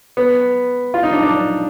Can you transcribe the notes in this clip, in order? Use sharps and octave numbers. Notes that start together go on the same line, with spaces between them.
B3
F4
D#4
D4
D4